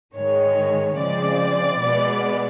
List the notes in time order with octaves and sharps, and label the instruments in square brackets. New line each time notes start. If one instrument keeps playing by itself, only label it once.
[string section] G#2 D#3 G#3 C#5
C#3 F3 G#3 C4 D5
B2 G#3 B3